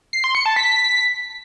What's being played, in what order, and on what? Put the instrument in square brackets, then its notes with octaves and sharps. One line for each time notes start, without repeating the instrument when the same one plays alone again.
[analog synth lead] C7
C6
C#7
A5
B6